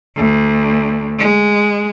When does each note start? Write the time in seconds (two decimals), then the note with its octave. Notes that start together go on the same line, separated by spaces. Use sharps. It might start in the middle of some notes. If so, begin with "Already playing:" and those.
0.17 D2
1.19 G#3